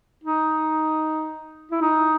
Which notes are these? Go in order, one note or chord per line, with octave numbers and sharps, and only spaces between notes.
D#4
E4
D#4